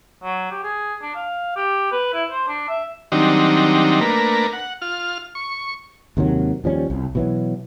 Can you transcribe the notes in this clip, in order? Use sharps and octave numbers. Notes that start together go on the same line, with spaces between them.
F#3
G4
G#4
D4
F5
G4
B4
E4
C5
D4
E5
D#3 F#3 G3 C4 D4 D#4
A3 A#3 D4 A#4 B4
F#5
F4 F6
C#6
D#2 C3 D#3 F#3
D#2 F3 G3 C#4
C2
B2 E3 F#3